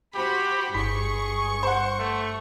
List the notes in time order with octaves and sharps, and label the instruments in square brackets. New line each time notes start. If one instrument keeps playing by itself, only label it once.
[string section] F#4 C5 B5 [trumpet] G4
[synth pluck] G1 B5 B6 [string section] G2 C#6 [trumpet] G#4
[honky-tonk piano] C5 F#5
[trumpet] A3